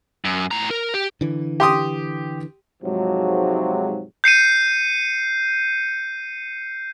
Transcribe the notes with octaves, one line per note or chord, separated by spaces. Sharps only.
F#2
A2 A#5
A#4
G4
D3 E3
G4 C6 D#6
G#2 C3 F3 F#3
G6 C7 C#7 D#7